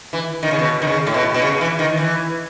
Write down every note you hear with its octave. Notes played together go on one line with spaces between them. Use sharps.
E3
D#3
C#3
B2
D#3
C#3
A2
B2
B2
C#3
E3
D#3
E3